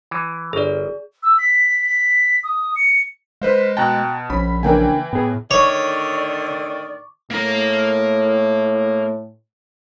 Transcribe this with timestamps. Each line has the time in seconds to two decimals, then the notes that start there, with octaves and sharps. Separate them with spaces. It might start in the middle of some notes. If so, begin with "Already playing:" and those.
0.11 E3
0.53 G1 G#4 D5
1.23 E6
1.38 B6
1.85 B6
2.43 D#6
2.76 C#7
3.42 G#3 B4 C5 F5
3.77 B2 G5 A5 A#5 F#6
4.30 A#1 C#4 B5
4.63 C#3 E3 A#3 D4 G5 G#5
5.13 A2 B3 G#4
5.51 A2 D3 D#3 C#5 D5 C#6 D6
7.31 A2 A#3 A#5